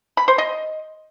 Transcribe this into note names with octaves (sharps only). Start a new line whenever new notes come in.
B5
C5
D#5